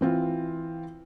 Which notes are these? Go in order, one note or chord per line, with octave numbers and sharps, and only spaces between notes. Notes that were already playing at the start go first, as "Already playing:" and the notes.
E3 C4 F4